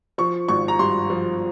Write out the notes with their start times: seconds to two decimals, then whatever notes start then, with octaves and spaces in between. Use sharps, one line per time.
0.18 F3 C#6
0.48 G#1 C#6
0.68 A#5
0.79 G2 C6
1.10 F3